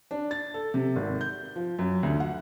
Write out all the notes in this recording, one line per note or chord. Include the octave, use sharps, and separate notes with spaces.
D4
A6
A4
C3
G#1
G6
F3
F#2
D2
F#5